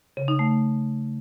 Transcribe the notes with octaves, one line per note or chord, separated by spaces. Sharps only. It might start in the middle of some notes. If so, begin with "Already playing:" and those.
C#3
D#4
A3